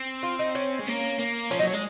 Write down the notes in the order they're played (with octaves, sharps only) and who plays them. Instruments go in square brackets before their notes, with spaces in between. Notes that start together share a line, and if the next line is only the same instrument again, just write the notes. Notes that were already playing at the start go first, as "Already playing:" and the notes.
Already playing: [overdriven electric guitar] C4
[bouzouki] F4
D#4
C#4
[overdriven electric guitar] G#3
A#3
A#3
[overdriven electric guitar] F3 [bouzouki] C#4
[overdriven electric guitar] F#3 [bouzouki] D#4
[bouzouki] C#4
[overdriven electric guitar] G#3